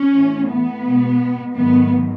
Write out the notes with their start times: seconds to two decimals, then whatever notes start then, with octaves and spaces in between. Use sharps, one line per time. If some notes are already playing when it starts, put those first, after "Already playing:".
Already playing: C#4
0.11 A2 E3 A3
0.47 B3
0.83 B2 G#3
1.54 G#2 D#3 F#3 A3 B3